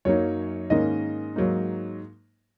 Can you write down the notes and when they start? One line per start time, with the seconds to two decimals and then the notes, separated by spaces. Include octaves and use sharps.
0.05 F#2 F#3 A#3 D#4 C#5
0.70 G#2 D#3 A#3 C#4 D#5
1.36 G#2 F#3 A#3 D#4